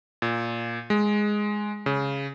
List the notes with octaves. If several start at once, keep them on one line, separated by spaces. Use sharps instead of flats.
A#2
G#3
C#3